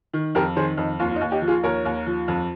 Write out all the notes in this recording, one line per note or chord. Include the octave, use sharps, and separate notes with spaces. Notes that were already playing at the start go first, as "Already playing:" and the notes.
D#3
F2 G4 A#4
D#3 G#4 C5
F2 D#4
D#2 F4
F4
D#4
D#2
D#4 G4
F3
F4 G#4
D#2 A#4 C#5
D#2
F3
F2